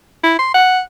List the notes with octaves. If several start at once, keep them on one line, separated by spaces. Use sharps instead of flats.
E4
C6
F#5